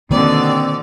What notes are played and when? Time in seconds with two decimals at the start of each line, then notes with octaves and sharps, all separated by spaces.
0.11 B2 D3 D#3 A#3 C4 D5